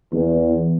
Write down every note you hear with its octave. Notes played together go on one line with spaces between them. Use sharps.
E2